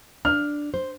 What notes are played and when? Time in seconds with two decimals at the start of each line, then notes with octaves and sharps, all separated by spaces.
0.25 D4 F6
0.74 C5